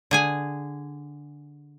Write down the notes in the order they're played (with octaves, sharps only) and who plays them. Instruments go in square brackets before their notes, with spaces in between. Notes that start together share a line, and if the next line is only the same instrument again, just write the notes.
[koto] D3 G#4 G#5